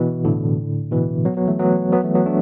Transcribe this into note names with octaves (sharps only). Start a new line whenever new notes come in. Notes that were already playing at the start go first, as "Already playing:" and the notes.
Already playing: B2 E3
A2 D3
B2 E3
F#3 B3
F#3 B3
E3 A3
F#3 B3
F#3 B3
E3 A3
F#3 B3
A3 D4